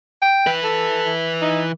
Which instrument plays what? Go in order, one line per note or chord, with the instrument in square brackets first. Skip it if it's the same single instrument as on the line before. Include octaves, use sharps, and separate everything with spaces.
[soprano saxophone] G5
[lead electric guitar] E3 B4
[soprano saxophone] A4
D#4